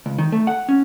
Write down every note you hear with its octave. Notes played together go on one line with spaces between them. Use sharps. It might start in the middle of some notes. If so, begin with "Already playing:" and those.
C#2
D#3
A3
F#5
C#4